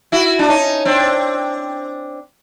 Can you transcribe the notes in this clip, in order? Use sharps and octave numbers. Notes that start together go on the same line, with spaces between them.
E4 F#4
D4
C#4 D#4
C4 D4